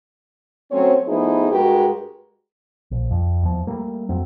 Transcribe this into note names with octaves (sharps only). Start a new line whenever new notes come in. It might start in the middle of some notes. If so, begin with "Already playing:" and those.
F#3 A3 C4 C#4 C5 C#5
F3 A3 B3 D#4 E4 G#4
G2 G#3 F#4 G4 A#4 B4
A#1
F2
E2 F3
G3 A3 A#3
F2 F#3 A3 C4